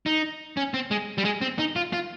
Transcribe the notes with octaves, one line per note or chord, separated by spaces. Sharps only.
D#4
C#4
C4
G#3
G3
G#3
C4
D#4
F4
F4